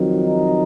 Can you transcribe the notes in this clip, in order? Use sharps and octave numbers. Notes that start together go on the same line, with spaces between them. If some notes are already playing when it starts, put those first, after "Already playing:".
Already playing: F2 D#3 F#3
D#4